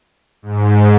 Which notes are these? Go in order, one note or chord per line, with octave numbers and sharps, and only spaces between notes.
G#2